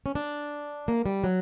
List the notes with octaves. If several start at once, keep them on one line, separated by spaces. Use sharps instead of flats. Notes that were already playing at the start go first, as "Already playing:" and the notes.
C#4
D4
A#3
G3
F#3